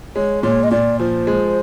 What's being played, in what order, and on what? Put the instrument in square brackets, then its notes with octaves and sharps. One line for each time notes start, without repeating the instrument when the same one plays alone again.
[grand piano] G#3 [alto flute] C#5
[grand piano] A#2 [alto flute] C#5
[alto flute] D#5
[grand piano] A#2 [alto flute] D5
[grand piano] F3 [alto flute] C5
[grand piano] G#3